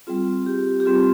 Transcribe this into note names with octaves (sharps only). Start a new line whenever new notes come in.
G3 C4 F4 G#4
G4
G4
G3 C4 F4 G#4